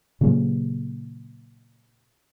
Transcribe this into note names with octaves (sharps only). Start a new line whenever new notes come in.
A#2 C#3 F#3 A#3